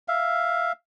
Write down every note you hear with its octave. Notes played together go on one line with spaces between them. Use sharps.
E5 F5